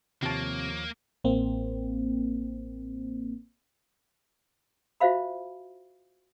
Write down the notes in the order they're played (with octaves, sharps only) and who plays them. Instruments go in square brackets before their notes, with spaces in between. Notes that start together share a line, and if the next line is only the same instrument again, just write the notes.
[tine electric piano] D#2 F3 C#5 [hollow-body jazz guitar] C3 A5 [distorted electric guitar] A#3
[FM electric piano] A1 A#3 C4
[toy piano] F4 F#4 C5 E5 F5 B5